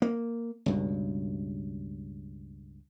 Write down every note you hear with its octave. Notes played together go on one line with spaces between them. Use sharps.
A#3
C#2 G2 B2